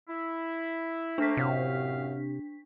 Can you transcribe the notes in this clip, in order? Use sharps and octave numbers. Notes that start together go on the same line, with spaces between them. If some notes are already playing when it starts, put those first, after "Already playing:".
E4
A3 A#3 D4 B6
F#2 A2 C3 F5